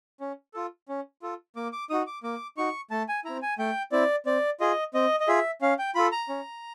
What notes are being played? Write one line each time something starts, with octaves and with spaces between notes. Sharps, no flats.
C#4
F4 A4
C#4
F4 A4
A#3 D6
D6
D#4 F#4 D#6
D6
A#3 D6
D#4 F#4 C#6
A3 A5
G#5
C4 E4 A#5
G#5
A3 G5
C4 E4 D5
C4 D5
F4 G#4 D#5
C4 D#5
D#5
F4 G#4 E5
C#4 F5
G5
F4 A4 B5
A#5
C#4